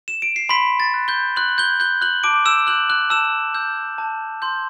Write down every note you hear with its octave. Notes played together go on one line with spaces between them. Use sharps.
E7
D7
C7
B5 C6 B6
A6
F#6
G6 G7
C6 F#6 F#7
G6 G7
F#6 G6 G7
F#6 F#7
A5 D6 D7
E6 E7
E6 F#6 G6 F#7
F#6 F#7
A5 E6 E7
E6 G6
A5
C6 G6